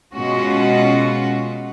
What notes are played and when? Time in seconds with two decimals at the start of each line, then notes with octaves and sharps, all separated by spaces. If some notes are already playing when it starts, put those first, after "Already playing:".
0.15 B2 G#3 C#4 F4 F#4